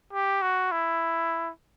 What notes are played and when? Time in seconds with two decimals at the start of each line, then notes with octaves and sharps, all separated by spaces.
0.13 G4
0.42 F#4
0.72 E4